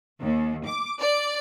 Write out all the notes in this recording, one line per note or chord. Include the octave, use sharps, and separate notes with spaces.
D#2
D6
D5